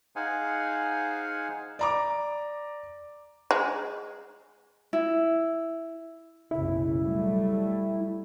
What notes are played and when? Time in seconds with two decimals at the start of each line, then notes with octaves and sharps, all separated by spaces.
0.16 D#4 G#4 C5 F5 F#5 G#5
1.79 D5 A#5 D6
3.51 G#3
4.93 E4
6.51 F#1 B1 C#3 E4
7.01 F#3 G3 A3